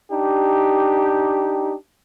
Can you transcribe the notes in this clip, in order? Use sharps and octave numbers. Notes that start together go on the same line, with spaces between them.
D4 D#4 G4